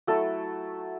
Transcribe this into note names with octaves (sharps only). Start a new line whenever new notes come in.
F#3 A3 E4 A4